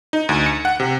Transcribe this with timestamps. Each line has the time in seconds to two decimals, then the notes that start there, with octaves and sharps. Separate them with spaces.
0.13 D#4
0.29 D2
0.46 C#7
0.65 F#5
0.80 C3